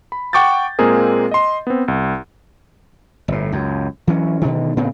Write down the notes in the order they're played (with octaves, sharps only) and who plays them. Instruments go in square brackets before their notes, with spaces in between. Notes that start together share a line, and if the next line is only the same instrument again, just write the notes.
[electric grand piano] B5
F#5 G5 C#6 D6 G6 A6
A#2 G#3 A#3 C4 G#4 A#4
D#5 C6
B3 C4
C2
[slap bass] G1 A2
C#2 F#2
E3 F#3 C#4
B2 D3 D#3
A2 C#3 B3 C4